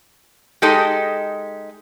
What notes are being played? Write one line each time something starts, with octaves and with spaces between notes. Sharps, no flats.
G#3 D#4 G4 A4 D#5